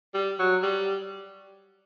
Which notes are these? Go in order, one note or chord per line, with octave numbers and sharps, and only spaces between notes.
G3
F#3
G3